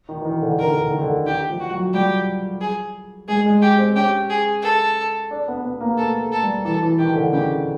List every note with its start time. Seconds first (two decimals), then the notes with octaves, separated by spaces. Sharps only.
0.09 D#3
0.21 E3
0.25 D#3
0.42 D3
0.52 D#3
0.59 D3 A#4
0.72 D#3
0.81 D3
0.91 D#3
1.02 D3
1.27 D#3 G4
1.50 F3
1.60 F#4
1.71 F#3
1.94 G3 G4
2.61 G#4
3.28 G#3 G#4
3.46 G#3
3.62 G4
3.79 C4
3.96 C#4 G4
4.30 G#4
4.63 A4
5.31 D4
5.48 B3
5.65 B3
5.81 A#3
5.98 A3 A4
6.20 A3
6.32 A4
6.42 G3
6.65 E3 A4
6.83 E3
6.99 D#3 G4
7.15 D3
7.33 C#3 G4